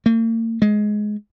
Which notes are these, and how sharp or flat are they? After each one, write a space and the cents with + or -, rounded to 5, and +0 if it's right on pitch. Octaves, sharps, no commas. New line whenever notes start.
A#3 -45
G#3 +15